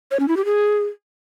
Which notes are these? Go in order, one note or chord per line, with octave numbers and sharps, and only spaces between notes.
C#5
C#4
E4
G4
G#4